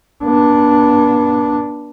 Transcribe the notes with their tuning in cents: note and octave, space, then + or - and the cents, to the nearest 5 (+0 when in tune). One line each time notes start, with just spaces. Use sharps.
B3 -40 D4 +0